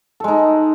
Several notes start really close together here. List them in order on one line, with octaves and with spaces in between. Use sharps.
A4 G#3 D#4